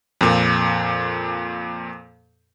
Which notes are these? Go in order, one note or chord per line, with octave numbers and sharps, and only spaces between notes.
F2 A#2